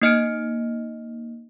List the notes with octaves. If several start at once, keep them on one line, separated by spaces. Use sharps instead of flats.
A#3 D#4 D#5 F6 C#7 D7